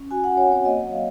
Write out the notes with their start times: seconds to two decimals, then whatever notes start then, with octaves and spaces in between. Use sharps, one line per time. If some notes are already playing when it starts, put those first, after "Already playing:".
Already playing: C#4
0.11 F#4 G#5
0.24 F#4 F#5
0.37 C#5
0.47 C4
0.52 C#5
0.65 A#3 D#5
0.83 F#3
0.92 F5